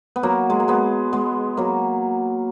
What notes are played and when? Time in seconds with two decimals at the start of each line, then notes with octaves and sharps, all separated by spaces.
0.16 B3
0.23 F#3 A#3
0.50 G#3
0.60 A#3
0.68 G#3 B3
1.13 G#3 B3
1.57 F#3 A#3